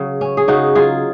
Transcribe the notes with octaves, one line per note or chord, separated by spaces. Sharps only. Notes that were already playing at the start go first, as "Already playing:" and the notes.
Already playing: C#3 F#3 F#4
C#4
G#4
C#3 D#4 F#4
F#3 F4 G#4